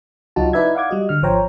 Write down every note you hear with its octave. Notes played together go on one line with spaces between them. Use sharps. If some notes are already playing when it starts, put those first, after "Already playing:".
C#2 F#3 D#4 F4 F#4 A5
D#4 E4 B4 D5 E5 G#6
F5 F#5 D6 G#6
G3 F#4 D#5
D3 F6
G#1 F3 C5 C#5 G5 A#5